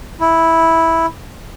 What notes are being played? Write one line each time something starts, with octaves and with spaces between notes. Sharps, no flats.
E4